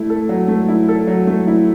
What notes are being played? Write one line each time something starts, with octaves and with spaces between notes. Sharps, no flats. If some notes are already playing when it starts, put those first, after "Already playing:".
Already playing: A3 E4
A4
F#3
A3
E4
A4
F#3
A3
E4